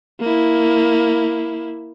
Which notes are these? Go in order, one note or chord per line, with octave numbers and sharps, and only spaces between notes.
A#3 E4